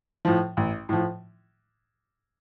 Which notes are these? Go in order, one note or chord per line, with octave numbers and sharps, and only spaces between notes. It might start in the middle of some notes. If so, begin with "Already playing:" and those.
A2 F3
A1
A2 F3